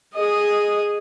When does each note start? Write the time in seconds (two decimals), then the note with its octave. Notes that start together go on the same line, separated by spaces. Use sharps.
0.15 G#4 D#5